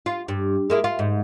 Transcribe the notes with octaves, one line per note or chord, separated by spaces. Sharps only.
F4
G2
G#3 A#3 E4
F4
G#2